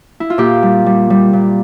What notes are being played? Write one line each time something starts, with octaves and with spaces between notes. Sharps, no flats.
E4
F4
A#2 G4
G3
G3
G3
A#2